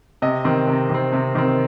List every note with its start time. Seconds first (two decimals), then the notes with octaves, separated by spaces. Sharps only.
0.22 C3 D#5
0.45 D#3 C4
0.67 C3
0.90 D#3 C4
1.13 C3
1.35 D#3 C4